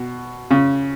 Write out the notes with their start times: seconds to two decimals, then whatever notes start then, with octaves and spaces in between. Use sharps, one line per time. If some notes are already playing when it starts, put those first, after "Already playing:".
Already playing: B2
0.51 C#3